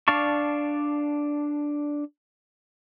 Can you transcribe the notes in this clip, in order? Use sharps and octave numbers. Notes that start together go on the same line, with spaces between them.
D4 D5 F5 A5 C#6